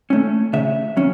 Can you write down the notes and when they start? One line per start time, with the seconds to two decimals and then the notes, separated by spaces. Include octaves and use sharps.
0.10 A3 C#4
0.53 C#3 E5
0.97 F#3 C#4